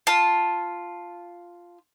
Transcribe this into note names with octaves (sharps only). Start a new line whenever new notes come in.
F4 A5